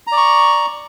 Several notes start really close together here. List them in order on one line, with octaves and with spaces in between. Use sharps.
A#5 D5 C#6